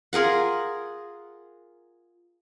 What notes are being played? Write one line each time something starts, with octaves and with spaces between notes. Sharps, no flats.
F4 G#4 A#4 F#5